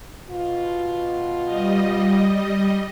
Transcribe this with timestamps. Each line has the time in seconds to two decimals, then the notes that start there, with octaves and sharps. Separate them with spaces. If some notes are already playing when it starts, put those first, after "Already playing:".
0.30 B2 F4
1.45 G3 D#5